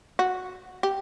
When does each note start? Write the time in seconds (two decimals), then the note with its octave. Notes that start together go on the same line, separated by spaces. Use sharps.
0.19 F#4
0.83 G4